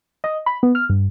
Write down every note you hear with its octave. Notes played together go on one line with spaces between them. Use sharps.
D#5
B5
B3
F6
G2